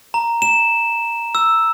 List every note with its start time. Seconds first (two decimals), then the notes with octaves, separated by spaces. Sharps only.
0.14 A#5
0.42 E7
1.35 E6